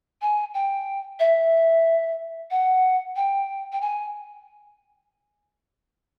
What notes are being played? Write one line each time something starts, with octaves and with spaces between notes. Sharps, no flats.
G#5
G5
E5
F#5
G5
G5
G#5